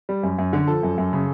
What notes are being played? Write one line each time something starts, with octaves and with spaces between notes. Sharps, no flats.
G3
F#2
F#2
D3
F3 A4
F#2
F#2
C#3